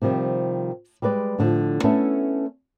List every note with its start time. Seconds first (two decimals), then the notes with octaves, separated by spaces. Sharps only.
0.02 C3 D#3 F3 G3
1.02 G3 G#3 B4 D5
1.39 A2 D3 D#3 F3
1.84 A3 B3 C#4 E4 A4